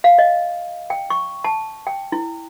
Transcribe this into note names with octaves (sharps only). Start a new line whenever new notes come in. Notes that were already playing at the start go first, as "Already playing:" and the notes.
F5
D#5
G5
C#6
A5
G5
E4